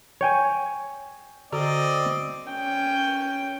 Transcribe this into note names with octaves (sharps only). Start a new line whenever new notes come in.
C#5 G5 G#5
D3 C4 F#4 A4 D5 D#5
C#4 G5